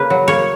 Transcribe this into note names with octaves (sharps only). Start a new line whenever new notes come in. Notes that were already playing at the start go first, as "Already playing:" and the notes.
Already playing: C#3 A#3 B4
F#3
A#3 C#5